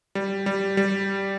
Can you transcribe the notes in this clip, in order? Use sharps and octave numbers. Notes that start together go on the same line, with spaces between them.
G3
G3
G3